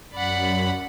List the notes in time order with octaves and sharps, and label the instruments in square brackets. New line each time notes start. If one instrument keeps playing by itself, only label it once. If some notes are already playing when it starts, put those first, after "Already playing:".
[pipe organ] F#2 B5 [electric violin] D5 F#5